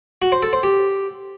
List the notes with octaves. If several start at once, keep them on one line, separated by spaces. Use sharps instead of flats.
F#4
C5
A4
C5
G4